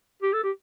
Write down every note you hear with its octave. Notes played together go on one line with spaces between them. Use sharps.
G4
A4
G4